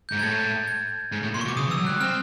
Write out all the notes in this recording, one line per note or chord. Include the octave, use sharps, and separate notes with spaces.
G6
G#2
G#6
A2 A6
G#6
G#2
A2
A#2 C6
C#6
B2
D6
C#3 D#6
E3
E6
F#3
G3 F#6
C4 F6